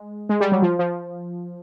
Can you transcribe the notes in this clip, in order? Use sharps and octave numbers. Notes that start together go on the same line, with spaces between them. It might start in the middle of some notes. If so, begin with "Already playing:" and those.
Already playing: G#3
G#3
G3
F#3
F3
F3